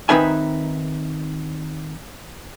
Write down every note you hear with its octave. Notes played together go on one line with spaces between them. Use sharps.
D#3 C4 D#4 B4 E5 G#5